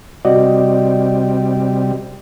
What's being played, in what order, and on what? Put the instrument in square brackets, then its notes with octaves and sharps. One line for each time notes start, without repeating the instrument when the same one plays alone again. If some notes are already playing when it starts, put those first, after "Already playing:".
[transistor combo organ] C3 G3 [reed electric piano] F#4 D5 D#5